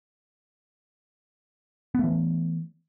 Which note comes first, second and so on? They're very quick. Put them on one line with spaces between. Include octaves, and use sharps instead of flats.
B3 A3 E3